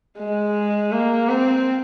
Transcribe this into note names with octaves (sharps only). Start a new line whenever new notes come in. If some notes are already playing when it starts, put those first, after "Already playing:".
G#3
A#3
C4